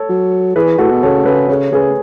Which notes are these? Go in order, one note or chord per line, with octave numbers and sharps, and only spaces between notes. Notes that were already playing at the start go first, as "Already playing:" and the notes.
Already playing: A4 C#5
F#3
E3 G#4 B4
A2 F#4 A4
B2
C#3 A4 C#5
C#3 G#4 B4
C#3 A4 C#5
C#3 G#4 B4